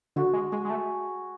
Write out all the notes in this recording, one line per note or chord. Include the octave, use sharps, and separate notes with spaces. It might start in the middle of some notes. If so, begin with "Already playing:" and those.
D3 F#4
G#3
G#3 G#4
G#3
A3